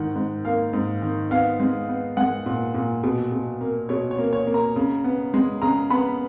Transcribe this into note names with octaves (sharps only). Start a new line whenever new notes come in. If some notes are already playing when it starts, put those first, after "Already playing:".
Already playing: G#2 D#3 F#5
G#2
A#3 F5
G#2
D#3
B3 F5
G#3
B3
G#3 F#5
A#2
A#2
B2
B2
A#3
B2 C#5
C#5
A#3
C#5
A#3
A#5
C#3
B3
G#3
C#3 A#5
B3 B5